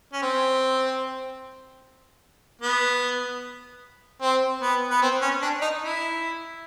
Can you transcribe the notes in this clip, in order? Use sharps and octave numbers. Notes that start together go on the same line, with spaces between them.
C#4
C4
B3
C4
B3
B3
C4
C#4
D4
D#4
E4